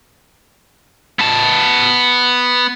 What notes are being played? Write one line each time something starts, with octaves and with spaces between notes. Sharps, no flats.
B3 A5